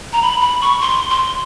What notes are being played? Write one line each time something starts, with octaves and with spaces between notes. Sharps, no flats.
A#5
B5
B5
C#6
C6
C6